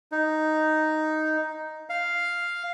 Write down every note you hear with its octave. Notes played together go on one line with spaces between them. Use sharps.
D#4
F5